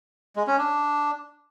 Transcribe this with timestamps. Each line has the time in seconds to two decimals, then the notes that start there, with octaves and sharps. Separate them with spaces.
0.36 G#3
0.47 C#4
0.58 D4